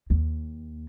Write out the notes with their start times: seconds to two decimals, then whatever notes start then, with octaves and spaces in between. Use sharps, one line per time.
0.10 D#2